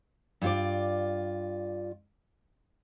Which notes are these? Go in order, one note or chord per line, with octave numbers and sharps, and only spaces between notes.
G2 F4 D5